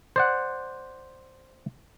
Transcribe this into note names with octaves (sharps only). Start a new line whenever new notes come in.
C5 D5 F#5